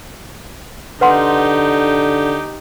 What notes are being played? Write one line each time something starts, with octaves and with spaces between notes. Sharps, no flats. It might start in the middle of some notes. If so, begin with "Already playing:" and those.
D3 D#4 G4 B4 F#5 C6